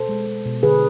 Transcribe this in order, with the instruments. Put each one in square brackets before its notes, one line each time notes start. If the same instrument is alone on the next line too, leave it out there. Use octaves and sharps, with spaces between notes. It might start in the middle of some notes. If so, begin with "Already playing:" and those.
Already playing: [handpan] B2 A4 C5
G#3
G#3
B2
D3 G#4 B4